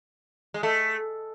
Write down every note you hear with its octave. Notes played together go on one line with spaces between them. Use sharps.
G#3
A3